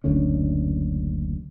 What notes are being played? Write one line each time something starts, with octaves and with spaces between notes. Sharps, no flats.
F#1 D2 D3 C#4